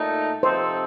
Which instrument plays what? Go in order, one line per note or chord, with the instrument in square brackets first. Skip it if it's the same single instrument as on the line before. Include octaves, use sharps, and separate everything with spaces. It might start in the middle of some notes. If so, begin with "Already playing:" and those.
Already playing: [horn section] A#2 A3 D#4
[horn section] C3 F3 C4 D#4 A4 [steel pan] C5